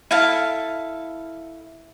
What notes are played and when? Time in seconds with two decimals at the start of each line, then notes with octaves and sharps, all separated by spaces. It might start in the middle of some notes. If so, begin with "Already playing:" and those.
0.11 E4 A4 F5 A5